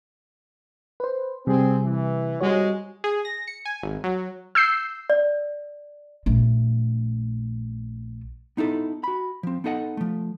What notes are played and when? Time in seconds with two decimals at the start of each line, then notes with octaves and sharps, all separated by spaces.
1.00 B4 C5
1.47 C3 G3 C4 G#4
1.83 E3
2.40 C2 G#2 G3 G#3 F#4 C#5
3.04 G#4
3.25 A#6
3.48 C#7
3.65 G#5
3.83 G#1
4.04 F#3
4.55 E6 G6 C7
5.10 D5
6.26 A#1 A3
8.57 B3 D#4 E4 A4
9.04 F#4 B5
9.43 F3 C4
9.64 B3 D#4 A4 D#5 F#5
9.97 F3 A3